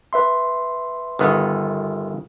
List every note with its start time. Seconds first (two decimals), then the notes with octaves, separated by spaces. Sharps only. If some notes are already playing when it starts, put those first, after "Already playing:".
0.13 B4 E5 C6
1.19 G1 D#3 B3